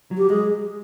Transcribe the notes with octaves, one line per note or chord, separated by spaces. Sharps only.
F#3
G4
G#3 G#4